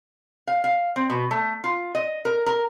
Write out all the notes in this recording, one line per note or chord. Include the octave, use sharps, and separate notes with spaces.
F5
F5
C4
B2
A3
F4
D#5
A#4
A#4